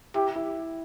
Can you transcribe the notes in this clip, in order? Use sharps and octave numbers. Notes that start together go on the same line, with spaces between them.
E4 G4
E4